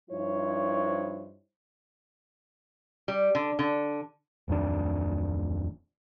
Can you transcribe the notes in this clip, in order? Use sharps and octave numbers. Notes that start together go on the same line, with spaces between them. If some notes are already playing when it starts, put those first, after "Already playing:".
G2 F3 D#4 E4 C5 C#5
G3
D3
D3
D1 F2 D#3 D4